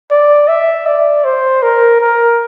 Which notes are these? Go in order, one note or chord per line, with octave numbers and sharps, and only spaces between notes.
D5
E5
D5
C5
A#4
A#4